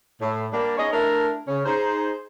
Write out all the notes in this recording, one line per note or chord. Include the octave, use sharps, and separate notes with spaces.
A2
G3 A#3 D4
B3 C#4 D#4 G#4 C#5 D#5
A3 D4 E4 A#4
C#3 C#4
D#4 G#4 C5